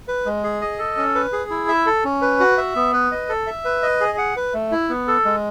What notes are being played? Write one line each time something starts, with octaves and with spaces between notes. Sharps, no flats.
B4
G#3
G#4
D#5
A4
C#4
B4
G#4
E4
E5
A4
C#4
B4
F#4
E5
B3
B4
D#5
A4
E5
B4
D#5
G#4
F#5
B4
A3
E4
B3
A4
G#3